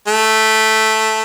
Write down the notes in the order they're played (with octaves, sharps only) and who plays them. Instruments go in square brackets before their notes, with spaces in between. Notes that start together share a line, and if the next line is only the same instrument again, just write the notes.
[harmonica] A3